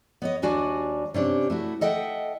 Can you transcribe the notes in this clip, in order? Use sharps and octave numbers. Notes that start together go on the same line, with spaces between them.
B3 C#5 D#5
D#2 G3 D4 F#4 G#5
C3 C#4 D4 G4
A3 E4 F#4
A4 D#5 E5 F#5 G5